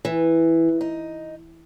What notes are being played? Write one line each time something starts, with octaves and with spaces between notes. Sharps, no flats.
E3
D#4